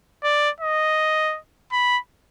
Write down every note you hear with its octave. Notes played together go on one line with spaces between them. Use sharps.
D5
D#5
B5